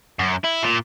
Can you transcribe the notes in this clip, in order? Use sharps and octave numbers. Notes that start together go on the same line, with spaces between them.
F#2
E4
A#2